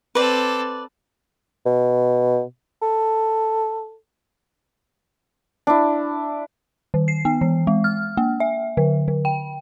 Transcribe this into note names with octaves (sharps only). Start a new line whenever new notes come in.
C4 A4 B4 D5
B2
A4
D4 E4
D#3
C7
B3
E3
G#3
F6
A#3
E5
D3
D3
G5